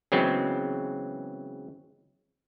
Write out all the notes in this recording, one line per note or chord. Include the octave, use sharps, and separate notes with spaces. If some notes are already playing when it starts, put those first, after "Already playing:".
C#3 E3 F#3 G#3 B3 C4